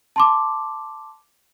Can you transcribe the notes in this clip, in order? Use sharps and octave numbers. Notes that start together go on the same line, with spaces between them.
A5 C6 D6